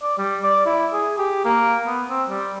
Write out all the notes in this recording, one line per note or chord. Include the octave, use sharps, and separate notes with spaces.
D5
G3
D5
E4
G#4
G4
A#3
B3
C4
G3